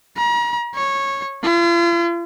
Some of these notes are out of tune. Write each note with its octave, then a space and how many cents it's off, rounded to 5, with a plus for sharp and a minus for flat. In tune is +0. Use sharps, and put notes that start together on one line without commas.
A#5 +40
C#5 -15
F4 -40